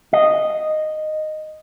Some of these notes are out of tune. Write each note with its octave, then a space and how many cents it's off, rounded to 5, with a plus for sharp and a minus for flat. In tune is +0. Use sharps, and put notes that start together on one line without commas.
D#5 -5